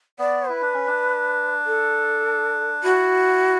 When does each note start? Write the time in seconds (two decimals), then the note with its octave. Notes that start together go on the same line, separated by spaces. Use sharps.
0.19 B3 D5
0.49 E4 B4
0.62 D4
0.74 C#4
0.87 D4
1.66 A4
2.84 E4 F#4